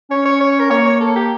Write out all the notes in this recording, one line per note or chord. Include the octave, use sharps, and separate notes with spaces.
C#4 C#5
C#5
C#5
A#4
A#3 C#5
C#5
A4
G4